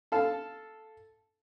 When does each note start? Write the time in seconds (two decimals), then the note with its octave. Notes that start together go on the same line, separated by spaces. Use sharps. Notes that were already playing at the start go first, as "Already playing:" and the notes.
0.12 A4 F5 A5